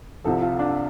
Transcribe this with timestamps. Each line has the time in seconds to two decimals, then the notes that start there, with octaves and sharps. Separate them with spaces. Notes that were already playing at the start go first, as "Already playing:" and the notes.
0.24 C2 C3 F3 A4
0.42 F4
0.59 D4